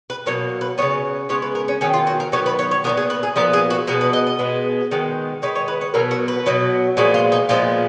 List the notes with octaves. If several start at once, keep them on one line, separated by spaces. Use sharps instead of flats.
B4
B2 F#3 A#3 C#5
B4
C#3 G#3 B3 C#5
C#3 G#3 B3 C#5
B4
A#4
C#4
D#3 F#3 B3 C#4
F4
F#4
A#4
D#3 F#3 B3 C#5
B4
C#5
C#5
F3 B3 A#4
A#2
G#4
B4
G#4
A#2 F3 B3 A#4
G#4
F#4
B2 G#3 B3 A#4
B4
D#5
D#5
B2 G#3 B3
D#3 G#3 B3
D#3 G#3 B3 C#5
C#5
B4
C#5
B2 F#3 B3 A#4
F#4
B4
B2 F#3 B3
A#2 F3 G#3 B3 F#4
F4
D#4
A#2 F3 G#3 B3 F4